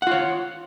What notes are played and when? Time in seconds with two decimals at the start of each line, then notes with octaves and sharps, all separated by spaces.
0.02 F#5
0.07 F4
0.11 C#5